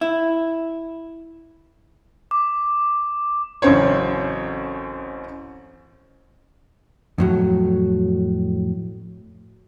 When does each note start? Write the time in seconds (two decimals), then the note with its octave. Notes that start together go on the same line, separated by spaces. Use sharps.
0.01 E4
2.31 D6
3.62 A1 F#2 C#3 C4 C5 C#5
7.18 F2 A2 F#3